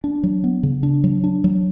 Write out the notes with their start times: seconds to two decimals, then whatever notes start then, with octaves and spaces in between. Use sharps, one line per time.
0.04 D4
0.23 F#3
0.44 B3
0.63 C#3
0.83 D4
1.04 F#3
1.24 D4
1.44 F#3